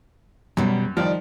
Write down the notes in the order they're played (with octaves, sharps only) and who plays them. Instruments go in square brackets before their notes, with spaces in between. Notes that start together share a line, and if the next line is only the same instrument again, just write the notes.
[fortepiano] F#2 [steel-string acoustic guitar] B2 G3
[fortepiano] D#3 F3 [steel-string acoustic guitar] G3 D5